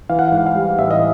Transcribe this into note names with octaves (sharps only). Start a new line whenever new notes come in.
E3 F5
F#5
G#2 F5
F#5
F5
G3
A1 E5
D#5